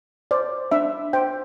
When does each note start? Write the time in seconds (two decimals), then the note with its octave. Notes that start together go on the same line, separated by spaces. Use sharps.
0.31 C5 D5
0.71 D4 E5
1.13 C5 G5